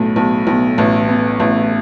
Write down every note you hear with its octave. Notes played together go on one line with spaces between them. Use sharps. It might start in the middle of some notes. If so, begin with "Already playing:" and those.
Already playing: B1 A2
B1
B1
A1
B3
A1